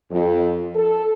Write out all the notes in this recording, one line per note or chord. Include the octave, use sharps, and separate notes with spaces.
F2
A4